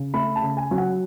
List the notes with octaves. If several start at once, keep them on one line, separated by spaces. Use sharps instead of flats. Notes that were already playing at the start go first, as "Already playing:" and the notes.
Already playing: C#3
A3 B5
A5
C#3
G#5
F#3
F#5